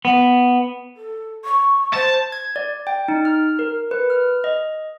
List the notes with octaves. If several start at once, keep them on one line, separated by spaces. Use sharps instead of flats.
B3
A4
C#6
C5 A5
G#6
D5
G5
D#4
F6
A#4
B4
F6
D#5